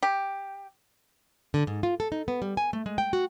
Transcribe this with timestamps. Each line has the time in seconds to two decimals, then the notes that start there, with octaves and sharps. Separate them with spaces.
0.03 G4
1.54 D3
1.67 G#2
1.83 F4
2.00 A4
2.12 D#4
2.28 B3
2.42 G3
2.57 G#5
2.73 A3
2.86 G#3
2.98 G5
3.13 F#4